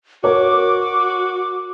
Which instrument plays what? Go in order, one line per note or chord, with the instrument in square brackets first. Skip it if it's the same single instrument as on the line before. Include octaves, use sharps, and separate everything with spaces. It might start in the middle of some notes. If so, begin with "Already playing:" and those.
[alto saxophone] F#4 [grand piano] A#4 C#5 [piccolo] D6